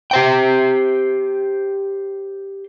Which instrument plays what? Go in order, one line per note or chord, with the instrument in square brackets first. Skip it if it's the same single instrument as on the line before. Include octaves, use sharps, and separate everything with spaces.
[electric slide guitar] G4 C5 G5